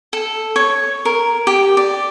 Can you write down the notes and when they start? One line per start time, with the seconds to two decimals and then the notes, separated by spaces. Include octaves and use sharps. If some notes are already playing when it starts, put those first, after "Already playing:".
0.13 A4
0.56 C#5
1.05 A#4
1.47 G4
1.77 D5